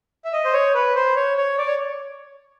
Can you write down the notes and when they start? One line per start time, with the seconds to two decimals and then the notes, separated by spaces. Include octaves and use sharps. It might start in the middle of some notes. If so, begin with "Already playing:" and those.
0.25 E5
0.33 D#5
0.45 C5
0.53 C#5
0.75 B4
0.95 C5
1.16 C#5
1.38 C#5
1.58 D5
1.66 C#5